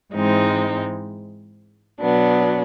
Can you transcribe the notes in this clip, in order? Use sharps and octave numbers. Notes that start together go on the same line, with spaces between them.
G#2 E3 G#3 C4 D#4
B2 F#3 B3 D4